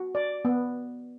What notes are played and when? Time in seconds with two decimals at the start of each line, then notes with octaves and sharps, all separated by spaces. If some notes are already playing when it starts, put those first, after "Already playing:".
Already playing: F#4
0.15 D5
0.45 B3